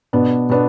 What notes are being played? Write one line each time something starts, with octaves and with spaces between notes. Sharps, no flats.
B2 B3 D4
B2 B3 D4